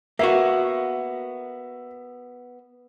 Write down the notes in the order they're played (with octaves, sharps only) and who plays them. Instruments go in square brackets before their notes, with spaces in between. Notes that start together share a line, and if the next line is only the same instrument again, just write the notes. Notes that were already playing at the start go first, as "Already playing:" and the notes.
[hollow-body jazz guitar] A#3 B3 F#4 [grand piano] E5